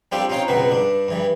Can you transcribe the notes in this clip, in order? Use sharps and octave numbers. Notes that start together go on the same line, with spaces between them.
G3 C4 D4 F4 G4 A4
C4 C#4 D#4 F4 C5 C#5
C#2 F#2 B2 F#3 C4 B4
G2 D4
G2 E3 G3